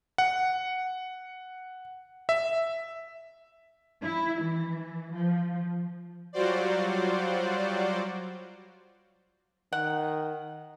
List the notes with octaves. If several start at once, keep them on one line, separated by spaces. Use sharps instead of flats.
F#5
E5
E4
E3
F3
F#3 G3 F4 F#4 C5 D5
D#3 F#5